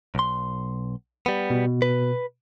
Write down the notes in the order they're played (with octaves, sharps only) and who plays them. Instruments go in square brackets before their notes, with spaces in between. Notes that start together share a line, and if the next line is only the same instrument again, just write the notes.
[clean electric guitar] B1 C6
G3 B3
[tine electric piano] B2
[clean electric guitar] B4